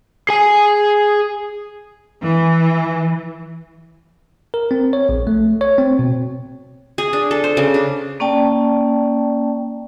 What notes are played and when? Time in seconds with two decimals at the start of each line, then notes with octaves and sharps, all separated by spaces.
0.29 G#4 G#5
2.23 E3
4.54 A#4
4.71 C4
4.93 C#5
5.09 A#1
5.27 A3
5.61 C#5
5.78 C4
5.99 B2
6.98 G#4
7.13 D4
7.31 A4
7.44 C5
7.57 C#3
7.74 D4
8.20 A#3 C#4 D5 G5 A5